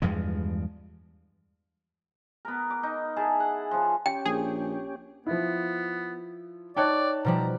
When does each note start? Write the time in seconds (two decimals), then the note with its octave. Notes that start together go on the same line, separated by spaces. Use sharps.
0.02 E2 G2 F3 G#3
2.45 B3 A#4
2.70 D6
2.83 D#4
3.16 E4 G#4 A5
3.40 F#5
3.71 C#3 F3
4.06 C#4 G4 G5
4.26 A#1 G#4
5.26 F3 B3 E4
6.76 D#4 C#5 D5 G5 A5 F#6
7.25 B2 F3 G3 A#5